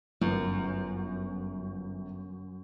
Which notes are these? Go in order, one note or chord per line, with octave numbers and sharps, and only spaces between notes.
G1 F#2